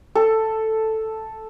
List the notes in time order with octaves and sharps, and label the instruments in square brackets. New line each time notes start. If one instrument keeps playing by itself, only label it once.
[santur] A4